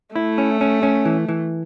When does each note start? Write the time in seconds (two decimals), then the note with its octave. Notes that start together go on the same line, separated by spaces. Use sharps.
0.15 A3 E4
0.38 C#4
0.61 C#4
0.83 C#4
1.05 E3
1.29 E3